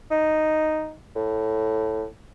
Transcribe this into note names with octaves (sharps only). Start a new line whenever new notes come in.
D#4
A2